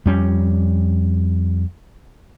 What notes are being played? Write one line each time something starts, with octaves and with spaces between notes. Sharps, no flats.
F2 G3 C#4